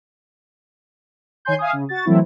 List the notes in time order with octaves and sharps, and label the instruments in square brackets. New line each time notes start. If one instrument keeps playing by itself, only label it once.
[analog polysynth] D#3 C#5 G#5 C6 G6
E5 F5 G#5 D#6
C#3
F#4 A6
E3 F#3 A3 C4 E4